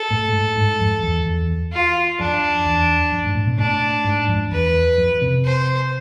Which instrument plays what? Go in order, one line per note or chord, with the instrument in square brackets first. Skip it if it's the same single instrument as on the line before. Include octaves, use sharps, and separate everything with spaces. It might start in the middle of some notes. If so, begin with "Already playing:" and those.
Already playing: [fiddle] A4
[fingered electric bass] A2
G#2
G#2
F2
E2
E2
[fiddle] F4
[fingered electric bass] F2 [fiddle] D4
[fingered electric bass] E2
F2
G#2
A2
B2
[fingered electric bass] A2 [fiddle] D4
[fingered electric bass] G#2
F2
[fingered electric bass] E2 [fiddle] B4
[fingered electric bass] F2
C3
[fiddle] C5